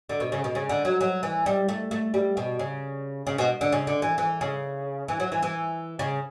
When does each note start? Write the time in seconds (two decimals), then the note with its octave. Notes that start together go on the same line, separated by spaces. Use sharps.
0.09 D3
0.20 B2
0.32 C#3
0.44 B2
0.55 C#3
0.69 D3
0.85 F#3
1.01 F#3
1.23 E3
1.46 G3
1.68 A3
1.91 A3
2.14 G3
2.37 B2
2.59 C#3
3.27 C#3
3.38 B2
3.61 D3
3.72 C#3
3.87 D3
4.02 E3
4.18 E3
4.41 C#3
5.08 E3
5.20 F#3
5.32 E3
5.43 E3
5.99 C#3